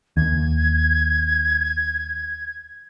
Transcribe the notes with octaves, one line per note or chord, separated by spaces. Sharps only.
D#2 G#6